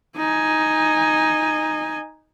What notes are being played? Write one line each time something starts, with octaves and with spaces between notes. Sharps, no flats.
D#4 G#5